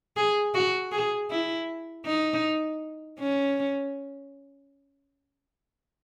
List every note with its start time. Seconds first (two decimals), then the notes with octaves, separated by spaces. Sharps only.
0.16 G#4
0.54 F#4
0.92 G#4
1.30 E4
2.06 D#4
3.19 C#4